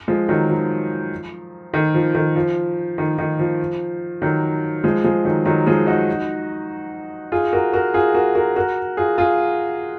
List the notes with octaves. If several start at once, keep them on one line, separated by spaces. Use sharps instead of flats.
F3 G#3
D#3 F#3
F3
D#3
F3
D#3
F3
D#3
D#3
F3
D#3 F#3
F3 G#3
F3 G#3
D#3 F#3
D#3 F#3
F3 G#3
D#4 F#4
F4 G#4
F#4 A#4
F#4 A#4
F4 G#4
F#4 A#4
F#4 A#4
F#4 A#4
F4 G#4
F4 G#4